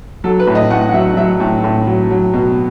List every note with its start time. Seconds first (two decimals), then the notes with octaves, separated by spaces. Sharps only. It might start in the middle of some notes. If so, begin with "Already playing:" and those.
0.24 F#3 A4
0.39 B4
0.47 A2
0.55 D#5
0.70 A2 F#5
0.89 F#5
0.94 F#3 E5
1.17 F#3 E5
1.40 A2
1.64 A2
1.87 F#3
2.10 F#3
2.33 B2